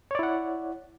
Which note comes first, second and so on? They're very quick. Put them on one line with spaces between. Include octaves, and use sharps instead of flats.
C#5 D5 E4 F#5